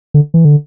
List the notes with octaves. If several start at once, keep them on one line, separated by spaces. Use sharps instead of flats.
D3
E3
D3